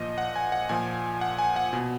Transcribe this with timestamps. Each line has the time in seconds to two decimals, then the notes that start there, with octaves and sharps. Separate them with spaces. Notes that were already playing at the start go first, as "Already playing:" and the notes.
Already playing: A#2 F3 D#5
0.18 F#5
0.36 G#5
0.52 F#5
0.69 A#2 F3 G#5
1.21 F#5
1.38 G#5
1.56 F#5
1.73 B2